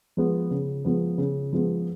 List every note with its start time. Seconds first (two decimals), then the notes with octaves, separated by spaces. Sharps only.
0.17 F3 G#3 B3
0.51 C#3
0.85 F3 G#3 B3
1.18 C#3
1.53 F3 G#3 B3